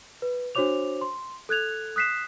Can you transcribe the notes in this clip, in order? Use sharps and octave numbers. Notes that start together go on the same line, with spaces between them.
B4
D4 F#4 C5 C#5 D6 F7
C6
A4 F#6 G#6 F7
D#6 F#6 B6 C7 E7